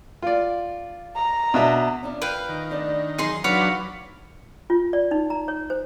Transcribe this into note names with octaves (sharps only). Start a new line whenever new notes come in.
F4 D5
A#5
B2 D4 E5
C#4 D4 F4
F3 B4 F5 G5
D#3
D2 D4 D5
E3 F#3 D#4 G#4 C6
F#3 D4 D#4 B4 C#5 F5 D6
F4
D5
D#4
A#5
C#5
C5